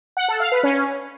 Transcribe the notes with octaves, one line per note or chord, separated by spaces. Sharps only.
F#5
A4
F5
B4
C#4